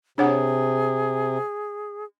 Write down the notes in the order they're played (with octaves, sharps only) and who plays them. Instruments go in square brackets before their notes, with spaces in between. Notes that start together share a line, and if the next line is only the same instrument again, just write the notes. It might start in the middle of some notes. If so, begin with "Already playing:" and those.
[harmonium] C3 [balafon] D4 C#5 F#5 [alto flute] G#4